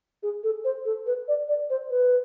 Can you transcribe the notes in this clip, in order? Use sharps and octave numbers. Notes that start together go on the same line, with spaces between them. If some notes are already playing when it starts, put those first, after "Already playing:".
G#4
A4
C5
A4
B4
D5
D5
C5
B4